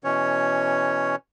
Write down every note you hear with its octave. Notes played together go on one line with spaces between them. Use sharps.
B2 E3 C#4 C#5